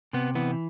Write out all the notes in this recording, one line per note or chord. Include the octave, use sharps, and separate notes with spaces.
C3 B3
E3 B3